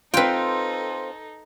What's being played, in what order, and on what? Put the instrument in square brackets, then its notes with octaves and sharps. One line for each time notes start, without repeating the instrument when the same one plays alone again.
[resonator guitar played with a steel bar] C4 F4 [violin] D#4 A4 [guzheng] B4 G5